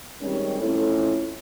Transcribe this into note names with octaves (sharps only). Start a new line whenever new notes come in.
D#3 G3 G#3 C4 C#4
F2 A3 C#4 E4 A4